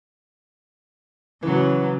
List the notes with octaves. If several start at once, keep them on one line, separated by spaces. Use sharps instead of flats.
C#3 E3 F#3